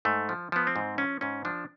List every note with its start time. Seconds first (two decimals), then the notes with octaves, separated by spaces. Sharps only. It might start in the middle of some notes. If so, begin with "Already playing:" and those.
0.05 G#2 A3
0.29 F3
0.52 F3 B3
0.67 C4
0.76 G#2
0.98 F3 C#4
1.21 G#2 C#4
1.45 F3 D4